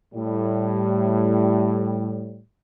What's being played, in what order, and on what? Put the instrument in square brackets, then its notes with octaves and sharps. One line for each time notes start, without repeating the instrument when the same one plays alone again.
[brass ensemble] A2 G3